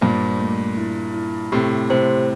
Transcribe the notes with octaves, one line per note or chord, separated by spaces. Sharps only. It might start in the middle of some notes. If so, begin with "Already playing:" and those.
G2 A#2 C5
A3
E4
E4
A2 C3 G4
A2 C3 C5